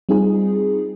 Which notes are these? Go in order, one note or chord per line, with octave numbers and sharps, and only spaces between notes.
G3 C4 D#4 F4 G#4